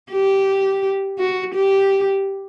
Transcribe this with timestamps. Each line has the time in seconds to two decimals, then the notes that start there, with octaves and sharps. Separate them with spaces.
0.12 G4
1.19 F#4
1.55 G4